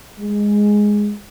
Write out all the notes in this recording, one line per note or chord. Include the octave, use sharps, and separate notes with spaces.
G#3